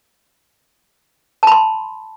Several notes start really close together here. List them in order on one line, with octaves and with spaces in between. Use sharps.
A5 B5 C6